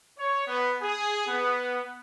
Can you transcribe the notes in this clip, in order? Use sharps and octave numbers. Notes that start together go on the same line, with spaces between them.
C#5
B3
G#4
B3